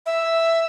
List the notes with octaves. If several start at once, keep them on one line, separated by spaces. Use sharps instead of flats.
E5